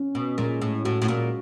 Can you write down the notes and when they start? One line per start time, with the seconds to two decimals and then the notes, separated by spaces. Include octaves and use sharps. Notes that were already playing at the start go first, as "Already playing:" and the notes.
Already playing: C#4
0.15 B2
0.38 A#2 G#3
0.62 A2
0.85 A2 F#4
1.02 A2
1.08 A#2